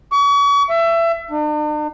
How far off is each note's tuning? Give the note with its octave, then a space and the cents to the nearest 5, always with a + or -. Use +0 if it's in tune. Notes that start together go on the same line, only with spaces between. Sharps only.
C#6 +40
E5 +25
D4 +45